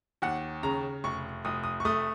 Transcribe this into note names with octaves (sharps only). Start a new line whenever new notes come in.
D#2 F#5
C#3 A#5
F1 C#6
F1 D#6
D#6
C#6
A3 D#6